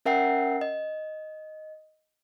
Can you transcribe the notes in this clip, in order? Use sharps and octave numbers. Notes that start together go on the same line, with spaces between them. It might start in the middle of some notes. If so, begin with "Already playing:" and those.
C#4 A#4 E5 F#5 G5 C7
D#5